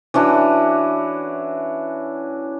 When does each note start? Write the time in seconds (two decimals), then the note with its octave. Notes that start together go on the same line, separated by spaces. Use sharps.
0.14 E3 C#4 D4 F#4